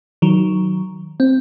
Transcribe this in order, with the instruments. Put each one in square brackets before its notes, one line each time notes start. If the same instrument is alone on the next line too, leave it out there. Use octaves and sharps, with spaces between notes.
[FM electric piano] D#3 F#3
C4